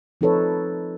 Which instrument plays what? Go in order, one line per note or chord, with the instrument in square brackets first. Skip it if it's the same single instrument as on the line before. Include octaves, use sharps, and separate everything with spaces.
[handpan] F3 C4 D#4 A4 B4 C#5